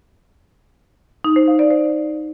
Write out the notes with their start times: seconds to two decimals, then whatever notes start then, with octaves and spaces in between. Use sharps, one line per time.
1.24 D#4
1.36 C5
1.48 F5
1.59 D5
1.71 C5